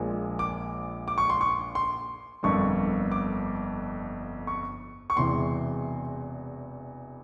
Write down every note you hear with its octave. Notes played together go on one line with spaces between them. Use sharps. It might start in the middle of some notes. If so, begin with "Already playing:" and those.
Already playing: A#1 A#2 F3 G#3
D6
D6
C#6
C6
C#6
C6
G1 F2 D3 G3 A#3 C#6
D6
C#6
C#6
E1 E2 C3 E3 C6